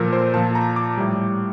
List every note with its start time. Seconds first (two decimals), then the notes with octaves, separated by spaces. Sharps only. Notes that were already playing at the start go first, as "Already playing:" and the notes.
Already playing: A#2 F3 A4 A#4
0.13 C5
0.33 A#2 F3 A5
0.55 A#5
0.76 D6
0.97 A2 G3